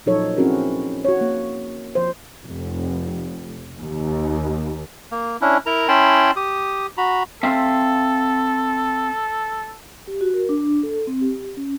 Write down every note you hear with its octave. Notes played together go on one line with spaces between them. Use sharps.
A#2 F3 F#3 D#4 A4 C#5
C4 C#4 E4 F#4 G#4 A#4
F#4 C#5
A#3
F3 C5
F1
D#2
A#3
C#4 D4 E4
E4 A#4 A#5
C#4 E4 G5 A5 B5 C6
G4 D#6
F#4 A#5 B5
C4 A4 E5 F5
G4
F#4
A#4
D4
A4
C4
G4
C#4